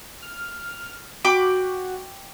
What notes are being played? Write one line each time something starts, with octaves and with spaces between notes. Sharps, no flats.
F6
F#4 G5 B5 D6